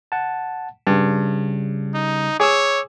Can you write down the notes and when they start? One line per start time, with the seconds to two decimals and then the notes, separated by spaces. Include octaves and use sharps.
0.12 F#5 A5
0.87 G2 C#3 G3
1.94 D#4
2.40 G#4 C#5 D6 E6